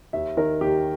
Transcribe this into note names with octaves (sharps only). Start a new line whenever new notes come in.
D#2 E5
D#3 A#4
D#2 G4